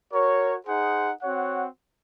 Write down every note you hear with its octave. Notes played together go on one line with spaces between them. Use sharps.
F#4 A#4 C#5
D#4 G#4 C5 F#5
C4 F#4 C#5 F#5